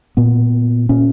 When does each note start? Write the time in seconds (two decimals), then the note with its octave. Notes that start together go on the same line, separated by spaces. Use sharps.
0.17 A#2 B3
0.89 A#2 C#4